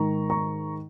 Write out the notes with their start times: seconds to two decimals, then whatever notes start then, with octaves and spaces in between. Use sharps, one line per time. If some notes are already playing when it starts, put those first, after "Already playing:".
Already playing: G#2 D#3 A#5 C#6
0.30 A#5 C#6